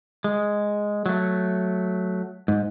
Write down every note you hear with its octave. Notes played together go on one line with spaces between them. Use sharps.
G#3
F#3 A3
G#2